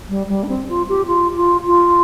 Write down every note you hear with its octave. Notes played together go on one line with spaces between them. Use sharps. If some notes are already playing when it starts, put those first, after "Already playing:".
G3
G3
D4
C4
F4
G4
F4
F4
F4